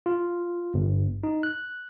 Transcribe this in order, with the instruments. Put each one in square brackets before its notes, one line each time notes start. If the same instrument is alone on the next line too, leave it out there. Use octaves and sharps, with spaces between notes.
[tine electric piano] F4
G1
D#4
F#6